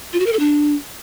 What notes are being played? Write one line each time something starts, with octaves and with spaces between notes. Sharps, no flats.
F4
F#4
A#4
A4
D4